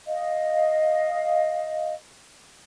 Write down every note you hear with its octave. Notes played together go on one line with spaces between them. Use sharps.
D#5 F5